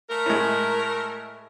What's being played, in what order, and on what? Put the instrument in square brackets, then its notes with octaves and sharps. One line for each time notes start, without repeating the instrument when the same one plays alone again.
[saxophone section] A3 A#4
[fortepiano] A2 G#3